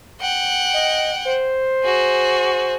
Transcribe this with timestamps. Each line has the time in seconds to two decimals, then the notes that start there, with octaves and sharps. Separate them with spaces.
0.20 F#5 G5
0.73 D#5
1.24 C5
1.83 F#4 G#4